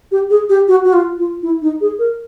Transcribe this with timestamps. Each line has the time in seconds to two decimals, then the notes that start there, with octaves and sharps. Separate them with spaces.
0.12 G4
0.30 G#4
0.49 G4
0.68 F#4
0.84 F#4
0.93 F4
1.18 F4
1.42 E4
1.62 D#4
1.81 G#4
1.99 A#4